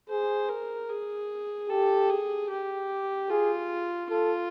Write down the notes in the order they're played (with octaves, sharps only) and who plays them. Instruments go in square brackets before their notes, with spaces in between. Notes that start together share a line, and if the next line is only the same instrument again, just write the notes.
[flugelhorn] G#4 [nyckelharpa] C5
[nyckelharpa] A#4
G#4
[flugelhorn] G4 [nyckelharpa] A4
[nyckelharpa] G#4
G4
[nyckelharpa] F4 [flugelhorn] G#4
[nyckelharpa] F4 [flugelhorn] A4